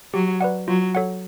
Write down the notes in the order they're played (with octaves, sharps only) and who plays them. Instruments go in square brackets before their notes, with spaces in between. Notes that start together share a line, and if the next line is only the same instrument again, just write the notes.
[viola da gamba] F#3 [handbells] G4
[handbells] B4 D5 F#5
[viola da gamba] F#3 [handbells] F4
[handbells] A4 C#5 F#5